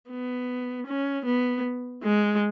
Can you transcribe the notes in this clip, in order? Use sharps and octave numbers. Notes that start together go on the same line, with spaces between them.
B3
C#4
B3
G#3